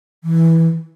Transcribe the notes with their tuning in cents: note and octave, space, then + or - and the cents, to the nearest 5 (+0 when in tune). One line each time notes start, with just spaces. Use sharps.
E3 -5